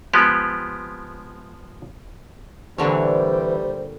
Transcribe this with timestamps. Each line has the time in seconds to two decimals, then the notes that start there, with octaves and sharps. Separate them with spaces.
0.13 F3 G#3 B3 G4
2.78 A#2 D3 E3 G3 C5 C#5